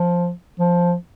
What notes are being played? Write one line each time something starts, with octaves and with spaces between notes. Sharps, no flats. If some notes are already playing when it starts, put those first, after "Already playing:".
Already playing: F3
F3